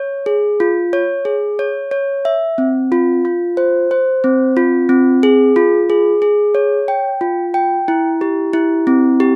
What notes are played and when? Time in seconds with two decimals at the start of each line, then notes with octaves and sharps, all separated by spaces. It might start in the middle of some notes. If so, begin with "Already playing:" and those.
Already playing: C#5
0.26 G#4
0.60 F4
0.93 C#5
1.25 G#4
1.59 C#5
1.91 C#5
2.25 E5
2.58 C4
2.92 F4
3.25 F4
3.57 C5
3.91 C5
4.24 C4
4.57 F4
4.89 C4
5.23 G#4
5.56 F4
5.90 G#4
6.22 G#4
6.55 C#5
6.88 G5
7.21 F4
7.54 G5
7.88 E4
8.21 G4
8.53 E4
8.87 C4
9.20 G4